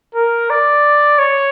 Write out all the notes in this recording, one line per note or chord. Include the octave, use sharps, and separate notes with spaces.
A#4
D5
C#5